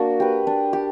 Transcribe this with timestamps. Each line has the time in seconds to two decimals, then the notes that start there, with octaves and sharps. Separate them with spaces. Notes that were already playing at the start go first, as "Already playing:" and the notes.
Already playing: A#3 D4 F#4
0.20 G4 B4
0.47 D4
0.73 G4